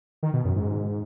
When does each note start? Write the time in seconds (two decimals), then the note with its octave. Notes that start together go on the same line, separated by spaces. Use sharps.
0.23 D#3
0.34 B2
0.45 F#2
0.56 G#2